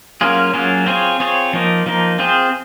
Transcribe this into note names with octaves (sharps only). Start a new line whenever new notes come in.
F#3 A#3 C#4 F4 G#4
F#3 A#3 C#4 F4 G#4
C4 F4 G#4 C#5
C4 F4 G#4 C#5
F3 A#3 D#4
F3 A#3 D#4
C4 F4 G#4 C5